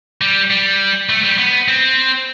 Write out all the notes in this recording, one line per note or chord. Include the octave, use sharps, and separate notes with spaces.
G3
G3
A3
G3
B3
C4